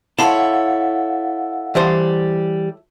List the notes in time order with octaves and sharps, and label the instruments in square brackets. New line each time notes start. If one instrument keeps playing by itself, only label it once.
[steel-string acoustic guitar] E4 A4 C#5 [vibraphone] F5 F#5 [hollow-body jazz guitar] A5 C6
[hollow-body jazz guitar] E3 G3 C5